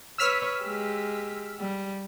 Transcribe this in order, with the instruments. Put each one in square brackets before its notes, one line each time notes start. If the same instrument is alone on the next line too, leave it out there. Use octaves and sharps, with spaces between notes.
[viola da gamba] B4 C#5 [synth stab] E6 F6 B6
[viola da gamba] G#3 G4
G3